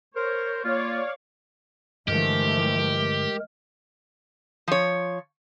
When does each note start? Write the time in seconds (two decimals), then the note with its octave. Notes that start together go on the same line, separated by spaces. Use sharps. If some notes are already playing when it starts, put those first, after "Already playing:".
0.15 A#4 C5 C#5
0.63 A#3 F4 C#5 D5 F5
2.08 G2 D3 E3 F3 G#3 A3 G4 A#4
4.68 F3 C#5